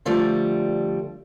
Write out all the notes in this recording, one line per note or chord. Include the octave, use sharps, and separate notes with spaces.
D3 F3 G3 A3